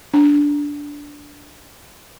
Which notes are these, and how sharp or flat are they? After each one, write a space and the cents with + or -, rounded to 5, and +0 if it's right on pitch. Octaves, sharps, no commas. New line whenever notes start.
D4 -10